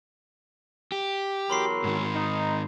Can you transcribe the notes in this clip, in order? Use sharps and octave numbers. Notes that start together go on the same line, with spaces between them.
G4
E2 F#3 A#4 B5 C6 C7
G#2 D#3
D#4